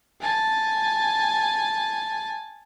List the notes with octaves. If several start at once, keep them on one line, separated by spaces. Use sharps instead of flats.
G#5 A5